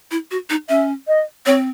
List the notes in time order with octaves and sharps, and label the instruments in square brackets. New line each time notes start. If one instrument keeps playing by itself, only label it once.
[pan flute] E4
F#4
D#4
[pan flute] C#4 [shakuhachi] E5
[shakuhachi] D#5
[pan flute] C4 [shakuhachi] C#5